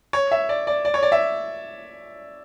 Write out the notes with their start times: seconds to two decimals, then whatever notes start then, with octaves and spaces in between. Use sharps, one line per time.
0.13 C#5
0.32 E5
0.49 D5
0.67 D5
0.85 D5
0.94 C#5
1.03 D5
1.12 E5